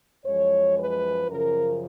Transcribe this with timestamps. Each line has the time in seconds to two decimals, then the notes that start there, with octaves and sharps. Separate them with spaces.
0.25 F#2 F3 G#3 C#5
0.77 B4
1.28 F#2 C#3 F3 A#4